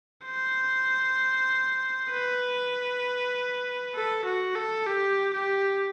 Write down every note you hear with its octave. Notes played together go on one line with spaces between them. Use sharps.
C5
B4
A4
F#4
A4
G4
G4